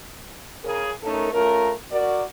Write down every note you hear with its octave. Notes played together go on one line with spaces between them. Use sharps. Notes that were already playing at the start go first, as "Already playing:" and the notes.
C#3 C#4 G#4 A#4
A3 C#4 D#4 A4 A#4
A3 C#4 F4 A#4
F#4 A#4 D5